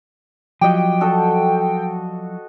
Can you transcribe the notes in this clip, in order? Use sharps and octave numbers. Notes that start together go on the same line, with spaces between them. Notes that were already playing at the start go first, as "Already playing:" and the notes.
F3 F#3 G4 D#5 G5
F#4 A4 D#5